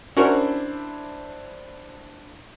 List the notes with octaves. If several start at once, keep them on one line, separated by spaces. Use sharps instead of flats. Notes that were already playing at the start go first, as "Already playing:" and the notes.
C#4 D4 E4 F#4 A#4 C5